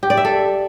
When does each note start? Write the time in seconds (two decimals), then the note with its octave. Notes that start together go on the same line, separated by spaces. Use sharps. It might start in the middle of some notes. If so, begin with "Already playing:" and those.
0.03 G4
0.10 D5
0.17 E5
0.25 A4